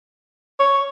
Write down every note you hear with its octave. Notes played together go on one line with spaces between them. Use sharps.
C#5